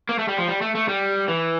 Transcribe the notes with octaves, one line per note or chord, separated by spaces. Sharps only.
A#3
A3
G3
F3
G3
A3
A3
G3
E3